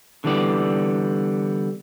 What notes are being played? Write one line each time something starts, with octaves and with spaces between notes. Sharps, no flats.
D3 E3 G3 B3 D5